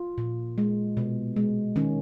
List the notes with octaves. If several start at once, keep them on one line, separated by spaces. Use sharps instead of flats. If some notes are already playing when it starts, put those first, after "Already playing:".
Already playing: F4
A#2
G#3
B2
G#3
D#3 C#4